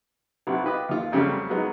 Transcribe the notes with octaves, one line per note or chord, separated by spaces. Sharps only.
B1 C3 F#3 B3
F4 G4 B4 D#5
D#2 F4
F2 C#3 F#3 G3 A3
F#3 G#3 B3 D#4